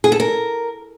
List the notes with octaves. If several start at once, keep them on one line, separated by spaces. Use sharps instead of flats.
G#4
A4
A#4